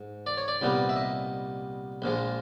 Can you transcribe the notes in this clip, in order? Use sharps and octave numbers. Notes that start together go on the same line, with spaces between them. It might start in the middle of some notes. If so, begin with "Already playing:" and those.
Already playing: G#2
D5
C#5
D5
C2 A#2 G3 B3 D#4
E5
D#5
A#1 A#2 F3 G#3